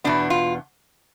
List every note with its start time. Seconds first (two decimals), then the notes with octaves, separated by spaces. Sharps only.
0.04 E2 B2 B3 D4
0.30 F4